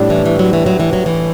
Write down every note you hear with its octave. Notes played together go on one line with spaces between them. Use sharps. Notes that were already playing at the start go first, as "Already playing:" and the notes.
Already playing: A2 G3 D4
E3
E3
F#3
E3
F#3
E3
F#3
E3